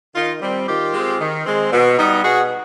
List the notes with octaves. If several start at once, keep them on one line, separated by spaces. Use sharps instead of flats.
D#3 D#4 F4
G3 C4
D#3 F4 G4
G#3 C4
D#3
G#3 C4
B2
G3 B3 D#4
B2 F#4 G#4